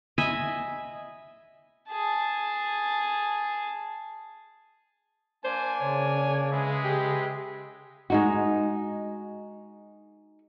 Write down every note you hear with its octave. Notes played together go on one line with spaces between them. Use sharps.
D#5 E5 G#5 B5
G#4 A5
A#3 D4 C5 D5 G#5
C#3 C#5
G#3 G#4 B4 E5
G4
G#3 D#4 F#4